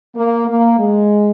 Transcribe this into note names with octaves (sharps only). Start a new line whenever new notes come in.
A#3
A#3
G#3